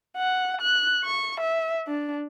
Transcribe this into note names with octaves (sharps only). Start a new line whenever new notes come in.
F#5
F#6
C#6
E5
D4